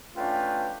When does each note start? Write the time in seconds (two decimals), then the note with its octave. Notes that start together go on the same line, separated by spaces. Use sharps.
0.16 A3 C#4 D4 F4 B4 G5